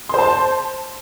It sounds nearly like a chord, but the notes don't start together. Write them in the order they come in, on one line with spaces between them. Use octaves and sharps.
C6 C5 A5